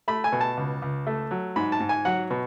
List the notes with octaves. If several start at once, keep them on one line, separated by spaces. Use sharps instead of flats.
A3 B5
G#5
B2
A5
C#2
C#2
A3
F#3
G#2 B5
A5
G#2
G#5
F#3 F#5
B2